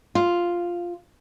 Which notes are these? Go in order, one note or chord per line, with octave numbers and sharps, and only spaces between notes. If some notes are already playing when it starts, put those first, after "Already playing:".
F4